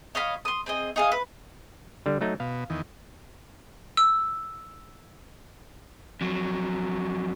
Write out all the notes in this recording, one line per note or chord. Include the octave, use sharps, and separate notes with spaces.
C#5 D#5 F5 B5
C6 D#6
C4 G#4 D#5
D#4 G#4 F5
B4
D3 G3
F#3 A3 D#4
B2 F5
E2 D#3
E6
F2 F#3